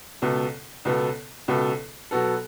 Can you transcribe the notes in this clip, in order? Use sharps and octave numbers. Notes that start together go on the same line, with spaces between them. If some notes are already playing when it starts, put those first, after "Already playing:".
C#2 B2 B3 A4
C#2 B2 B3 A4
C#2 B2 B3 A4
B2 F#3 B3 F#4 A4